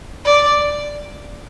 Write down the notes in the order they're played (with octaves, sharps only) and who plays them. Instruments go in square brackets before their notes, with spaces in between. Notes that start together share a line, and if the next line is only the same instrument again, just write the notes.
[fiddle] D5